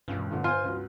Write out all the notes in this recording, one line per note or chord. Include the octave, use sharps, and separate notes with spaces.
E1 C#2 G2
F2 A#2 D3
F4 C5 G#5
C#2 F#3